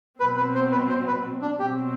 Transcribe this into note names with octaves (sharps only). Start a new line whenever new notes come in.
B2 F#3 C4 B4
B4
C5
B4
C5
B4
D4
B2 F#3 C4 G4